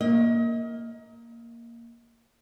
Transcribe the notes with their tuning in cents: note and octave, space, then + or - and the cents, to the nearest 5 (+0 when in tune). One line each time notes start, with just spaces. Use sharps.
A#3 +0 D#5 +35